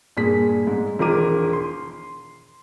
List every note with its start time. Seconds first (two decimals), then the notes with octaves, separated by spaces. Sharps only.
0.17 G2 A#2 G#4 B6
0.67 G#2 G#3
0.99 E1 D#3 F3 A#4 D6 D#7
1.53 C6